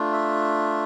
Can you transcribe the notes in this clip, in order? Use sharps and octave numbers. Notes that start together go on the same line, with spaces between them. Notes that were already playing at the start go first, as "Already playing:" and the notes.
Already playing: A3 D4 F4
E5